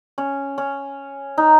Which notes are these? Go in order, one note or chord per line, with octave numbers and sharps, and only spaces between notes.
C#4
C#4
D#4